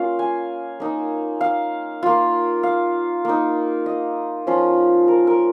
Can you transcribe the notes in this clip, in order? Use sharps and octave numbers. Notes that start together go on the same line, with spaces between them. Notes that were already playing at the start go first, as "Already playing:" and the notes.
Already playing: A#3 C#4 F4 F5
G#5
A#3 D#4
F5
A#3 F4
F5
A#3 D#4
D#5
F3 C#4 F4
A#4
A#4